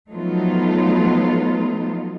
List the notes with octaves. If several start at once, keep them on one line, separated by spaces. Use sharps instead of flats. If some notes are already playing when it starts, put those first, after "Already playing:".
F3 F#3 A3 B3 D#4 F4